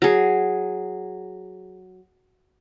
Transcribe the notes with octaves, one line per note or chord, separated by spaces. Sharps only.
F#3 G#4